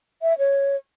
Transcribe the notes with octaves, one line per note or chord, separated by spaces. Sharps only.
E5
C#5